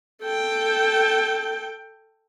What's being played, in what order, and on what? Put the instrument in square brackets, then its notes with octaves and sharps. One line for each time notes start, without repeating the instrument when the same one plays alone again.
[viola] A4 G5